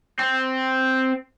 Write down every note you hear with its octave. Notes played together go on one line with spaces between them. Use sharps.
C4